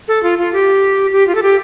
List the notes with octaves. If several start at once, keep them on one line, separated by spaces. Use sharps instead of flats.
A4
F4
F4
G4
G4
F4
A4
G4